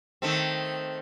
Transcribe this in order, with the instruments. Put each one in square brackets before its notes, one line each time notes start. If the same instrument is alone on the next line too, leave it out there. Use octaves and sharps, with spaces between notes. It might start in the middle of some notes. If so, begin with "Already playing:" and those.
[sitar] D#3 A3 C4